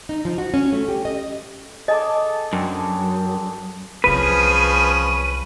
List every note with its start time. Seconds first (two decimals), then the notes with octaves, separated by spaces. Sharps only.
0.09 D#4
0.25 F3
0.38 F#4
0.54 C#4
0.72 A3
0.88 G4
1.05 D#5
1.88 G#4 A4 D#5 D6
2.53 F#2 C4 D4
4.04 C2 F3 F#3 C#4 G#4 B4 D#7